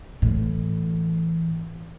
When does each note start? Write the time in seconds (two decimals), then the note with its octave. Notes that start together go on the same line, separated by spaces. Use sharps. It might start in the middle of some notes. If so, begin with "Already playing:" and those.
0.22 A2 E3